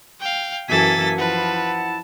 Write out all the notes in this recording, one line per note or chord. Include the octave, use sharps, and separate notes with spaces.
F5 G5
F#2 E3 A#3 A4 G#5 A6 B6
F3 E4 B4 F#5 A5